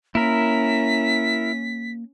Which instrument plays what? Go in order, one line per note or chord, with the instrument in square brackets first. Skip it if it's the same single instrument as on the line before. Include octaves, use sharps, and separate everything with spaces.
[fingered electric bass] A#3 [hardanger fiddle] C#4 [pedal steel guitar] E4 A#4 [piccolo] B6